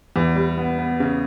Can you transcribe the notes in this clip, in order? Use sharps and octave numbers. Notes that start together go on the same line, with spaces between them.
E2
G3
B3
B3
C#3